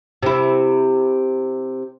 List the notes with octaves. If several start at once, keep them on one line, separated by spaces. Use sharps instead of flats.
C3 E4